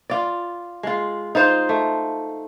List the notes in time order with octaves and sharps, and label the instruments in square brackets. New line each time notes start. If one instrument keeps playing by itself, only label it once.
[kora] F4 D5
G#3 F4
D#4 F4 C5 F5
A3